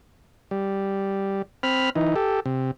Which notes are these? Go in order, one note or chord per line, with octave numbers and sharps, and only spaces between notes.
G3
C4 B5 F6
E3 D#4
G4 A4
C3